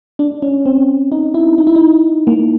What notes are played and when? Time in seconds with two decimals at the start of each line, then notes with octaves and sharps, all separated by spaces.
0.19 D4
0.42 C#4
0.66 C4
1.12 D#4
1.34 E4
1.58 D#4
1.67 E4
1.75 D#4
2.27 A#3